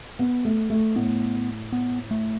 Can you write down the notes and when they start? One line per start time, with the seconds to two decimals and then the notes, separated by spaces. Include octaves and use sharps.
0.19 B3
0.45 A3
0.70 A3
0.96 A2 B3
1.73 B3
2.11 A3